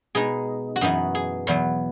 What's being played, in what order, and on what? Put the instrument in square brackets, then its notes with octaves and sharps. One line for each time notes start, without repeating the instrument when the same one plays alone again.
[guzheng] B2 G#3 D#4 G#4
F#4
F#2 E3 B3 D#4 G#4
G#4
E2 B2 F#3 B3